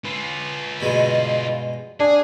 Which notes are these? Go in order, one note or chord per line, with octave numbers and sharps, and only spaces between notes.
F4 B4
G2 B2 G#3
D4 G#4